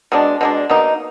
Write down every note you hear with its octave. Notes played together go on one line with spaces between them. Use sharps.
B2 G#3 D4
B2 G#3 D4
B2 A#3 D#4